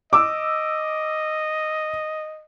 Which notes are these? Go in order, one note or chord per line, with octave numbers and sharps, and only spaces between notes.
D#5 D6 E6